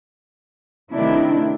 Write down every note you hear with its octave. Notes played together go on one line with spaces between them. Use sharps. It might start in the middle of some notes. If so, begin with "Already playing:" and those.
C3 D#3 A3 D4 E4